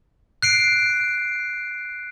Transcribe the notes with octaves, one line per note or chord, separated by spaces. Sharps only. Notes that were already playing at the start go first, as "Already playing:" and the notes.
F#6 C7 D7